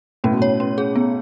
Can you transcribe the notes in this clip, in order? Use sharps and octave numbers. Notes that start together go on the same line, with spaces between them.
A2 C#4
B2
A2 C#5
C#4
G#4
B3